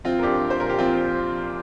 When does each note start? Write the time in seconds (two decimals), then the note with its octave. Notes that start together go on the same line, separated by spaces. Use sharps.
0.04 F3 C4 F4
0.19 A#4
0.23 A#1 D4 G4
0.42 A#1
0.50 C5
0.60 A#2 A#4
0.70 G4
0.79 F3 C4 F4